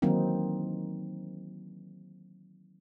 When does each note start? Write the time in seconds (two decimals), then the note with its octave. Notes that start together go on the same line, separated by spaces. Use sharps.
0.02 D#3 E3 F#3 A#3 C4 D#4